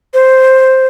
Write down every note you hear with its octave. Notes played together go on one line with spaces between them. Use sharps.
C5